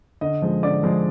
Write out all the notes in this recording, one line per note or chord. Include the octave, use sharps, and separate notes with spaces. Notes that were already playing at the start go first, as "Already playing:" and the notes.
D3 D#5
F3 G#3
D3 D5
F3 G#3